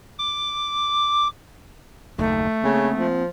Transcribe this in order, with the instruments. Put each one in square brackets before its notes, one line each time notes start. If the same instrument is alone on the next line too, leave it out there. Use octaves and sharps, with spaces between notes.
[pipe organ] D6
[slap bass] F#1 D#2 D#3 [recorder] A3
[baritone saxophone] C#3 [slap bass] A#3 C4
[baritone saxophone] F3